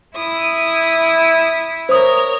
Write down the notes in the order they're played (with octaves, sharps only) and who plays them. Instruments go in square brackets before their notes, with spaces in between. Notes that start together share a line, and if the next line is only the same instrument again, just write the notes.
[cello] E4 [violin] D#6
[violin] A#4 C#5 [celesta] C5 D#6